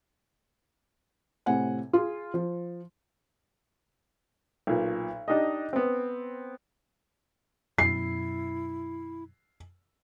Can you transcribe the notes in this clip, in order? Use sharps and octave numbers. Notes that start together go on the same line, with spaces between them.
A2 C3 F#5 G#5
F4 G#4
F3
B1 A#2
D4 D#4 G4 D#5
B3 C4
F#2 B2 E4 C7